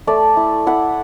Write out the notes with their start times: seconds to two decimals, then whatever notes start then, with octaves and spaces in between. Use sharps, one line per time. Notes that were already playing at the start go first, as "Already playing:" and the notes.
0.07 A3 D5
0.37 E4
0.67 E4 F#5